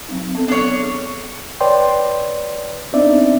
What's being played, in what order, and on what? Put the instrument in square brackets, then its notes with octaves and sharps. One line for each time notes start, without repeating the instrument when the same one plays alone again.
[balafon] F#3 C4 D#4
B3 A4
[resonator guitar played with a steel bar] D4 C#5
[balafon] G#4
[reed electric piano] B4 C#5 D5 G5 C6
B3 C4 D4 D#4 D5 E5